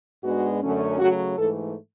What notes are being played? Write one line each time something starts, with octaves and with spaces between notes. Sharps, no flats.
G#2 G#3 B3 D4 F#4
F#2 D3 F#3 A3 C#4
C#3 F#3 A3 F#4
G#2 E3 A3 A4